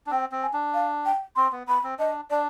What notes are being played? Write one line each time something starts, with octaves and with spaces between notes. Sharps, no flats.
D4
C4 G5
C4
G#5
D4
F5
G5
C4 C6
B3
B3 B5
C4
D4 D#5
D4 D5